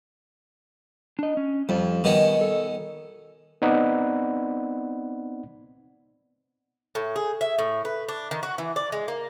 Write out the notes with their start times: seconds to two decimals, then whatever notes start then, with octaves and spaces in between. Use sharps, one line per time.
1.19 D4 D#5
1.37 C#4
1.69 F2 G3 F4
2.04 B2 D#3 G3 C#4
2.41 A4
3.62 B3 C4 D#4 D5 F#5 B5
6.95 A2
7.16 G#4
7.41 E5
7.59 A2
7.85 B4
8.09 D4
8.31 D#3
8.43 F#4
8.58 E3
8.76 D5
8.92 G#3
9.08 A#3